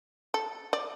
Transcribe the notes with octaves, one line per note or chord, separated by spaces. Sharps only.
A4
D5